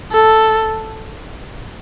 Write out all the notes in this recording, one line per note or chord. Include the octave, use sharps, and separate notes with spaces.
A4